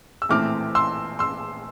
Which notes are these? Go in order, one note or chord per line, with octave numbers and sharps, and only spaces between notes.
E6
A#1 A2 E3 A3 C4 D6 F6
C6 E6
C6 E6